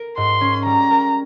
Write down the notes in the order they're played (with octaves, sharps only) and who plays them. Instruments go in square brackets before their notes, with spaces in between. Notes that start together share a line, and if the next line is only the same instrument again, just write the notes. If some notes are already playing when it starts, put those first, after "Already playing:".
Already playing: [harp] A#4
[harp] G#2 [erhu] C6
[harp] C#4
[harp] G3 [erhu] A#5
[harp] A#4